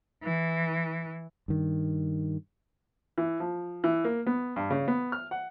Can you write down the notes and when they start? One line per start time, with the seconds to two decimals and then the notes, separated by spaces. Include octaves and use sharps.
0.24 E3
1.48 G2 D#3
3.18 E3
3.40 F3
3.84 E3
4.04 A#3
4.27 B3
4.56 G2
4.70 C#3
4.88 B3
5.12 F6
5.31 F#5